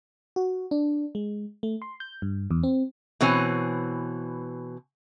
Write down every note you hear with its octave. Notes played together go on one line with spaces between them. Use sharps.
F#4
D4
G#3
A3
C6
G6
G2
E2
C4
B2 E3 C4 C#5 G#5